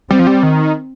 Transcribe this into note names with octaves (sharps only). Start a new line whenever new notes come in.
G3 C4
F3
G3
D#3